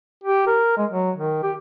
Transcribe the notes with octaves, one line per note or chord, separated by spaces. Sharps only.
G4
A#4
G#3
F#3
D#3
G4